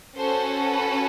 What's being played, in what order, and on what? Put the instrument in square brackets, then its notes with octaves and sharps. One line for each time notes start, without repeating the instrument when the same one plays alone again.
[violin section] C#4 F#4 A4 C5
B4